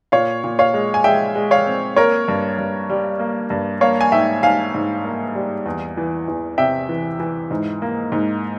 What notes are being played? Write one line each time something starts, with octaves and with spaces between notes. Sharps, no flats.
A#2 C#5 F5
A#2
C#5 F5
G#3
G#5
G#3 E5 G5
G#3
C#5 F5
C4
A#3 A#4 C#5
G2
G2
G3
A#3
G2
A#3 C#5 F5
G#5
G#2 E5 G5
G#2 F5 G#5
G#2
A#3
G3
E2
E3
E2
C3 E5 G5
E3
E3
G#2
A#3
G#2